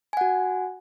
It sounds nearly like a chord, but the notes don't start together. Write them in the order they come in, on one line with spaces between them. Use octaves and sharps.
G#5 F#5 F#4